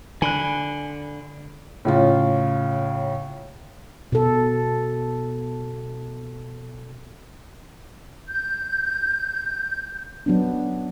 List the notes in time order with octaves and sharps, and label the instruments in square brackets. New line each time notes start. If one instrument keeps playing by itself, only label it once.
[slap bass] D3 [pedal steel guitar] G#5 B5 F#6
[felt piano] A2 C#3 F4
[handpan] B2 A4
[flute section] G6
[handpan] F#3 B3 D4